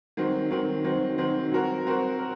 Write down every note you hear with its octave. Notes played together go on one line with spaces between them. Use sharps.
D#3 F#3 C4
D#3 F#3 C4
D#3 F#3 C4
D#3 F#3 C4
F#3 C4 F#4 A#4
F#3 C4 F#4 A#4
A#4